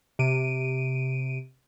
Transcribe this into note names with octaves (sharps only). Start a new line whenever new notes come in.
C3 D7 D#7